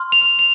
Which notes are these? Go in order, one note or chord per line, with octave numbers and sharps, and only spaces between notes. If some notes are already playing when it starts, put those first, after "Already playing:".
Already playing: C6 F6
F7
F7